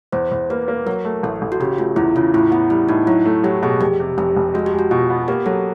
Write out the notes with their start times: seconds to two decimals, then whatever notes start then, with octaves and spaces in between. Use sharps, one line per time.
0.12 E2 C5
0.32 E2
0.50 A#3 B4
0.68 A#3
0.86 F#3 A#4
1.05 A3
1.23 A1 A4
1.42 A1
1.52 F#4
1.59 C#3 G4
1.78 A3 F4
1.96 E2 E4
2.16 C#3 F4
2.34 A2 E4
2.52 B3 E4
2.70 G3 E4
2.89 A2 D#4
3.07 F#3 E4
3.26 A3
3.44 F#3 G4
3.62 B2 G#4
3.81 F1 G4
4.00 C3
4.18 F1 G4
4.37 F1
4.54 G#3 F#4
4.66 G4
4.73 G#3
4.79 F#4
4.91 B2 F4
5.10 B3
5.28 A#3 G4
5.46 F#3 A4